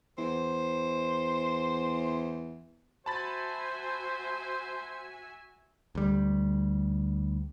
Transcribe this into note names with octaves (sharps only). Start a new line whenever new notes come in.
E2 C5
F#4 C5 E5 G#5 A5 B5 A6
D2 G3